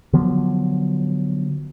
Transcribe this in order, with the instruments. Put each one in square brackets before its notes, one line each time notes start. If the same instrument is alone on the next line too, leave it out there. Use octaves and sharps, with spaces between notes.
[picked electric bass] D3 F3 F#3 B3